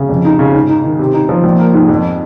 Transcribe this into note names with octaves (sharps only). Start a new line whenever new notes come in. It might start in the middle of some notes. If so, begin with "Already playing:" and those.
Already playing: C#3
F2
D#4
C#3
G#2
D#4
D#3
C3
D#4
F3
A#1
A#3
G#2
F2